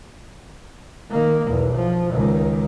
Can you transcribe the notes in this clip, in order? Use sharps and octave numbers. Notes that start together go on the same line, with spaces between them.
D#3 A#3
B1 E2
F3
C#2 D#3